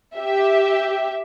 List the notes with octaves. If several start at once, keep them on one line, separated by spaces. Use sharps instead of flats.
G4 E5